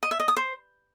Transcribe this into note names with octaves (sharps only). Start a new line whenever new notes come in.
D#5
E5
D#5
D#6
C5